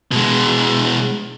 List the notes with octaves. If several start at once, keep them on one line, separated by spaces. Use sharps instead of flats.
B2 G#3